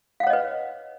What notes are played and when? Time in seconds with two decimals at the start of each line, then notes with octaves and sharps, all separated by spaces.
0.20 F5
0.23 F#5
0.27 C#5
0.30 D#5
0.33 B4